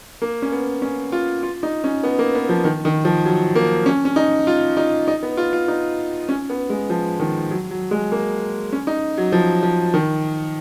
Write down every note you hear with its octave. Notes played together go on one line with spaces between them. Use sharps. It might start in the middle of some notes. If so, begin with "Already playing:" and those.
A#3
C#4
B3
C#4
F4
F4
D#4
C#4
B3
A#3
B3
F3
D#3
D#3
F3
F#3
A#3
C#4
C#4
D#4
F4
D#4
D#4
B3
F4
F4
D#4
C#4
B3
G#3
F3
D#3
F#3
F#3
G#3
A#3
C#4
D#4
F#3
F3
F3
D#3